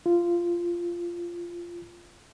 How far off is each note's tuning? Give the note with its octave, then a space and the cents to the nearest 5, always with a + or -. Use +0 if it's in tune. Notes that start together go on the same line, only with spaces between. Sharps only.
F4 -10